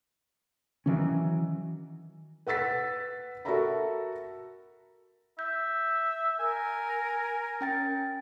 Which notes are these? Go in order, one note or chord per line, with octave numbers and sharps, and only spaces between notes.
D#3 E3 F#3 C#4
B4 F#5 E6 A6 B6
F#4 A4 A#4 E5 A#5 B5
E5 G6
A#4 G#5
C#4 G5 A6